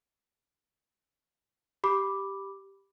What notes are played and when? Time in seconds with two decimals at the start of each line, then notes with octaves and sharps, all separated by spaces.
1.84 G4 B5 D6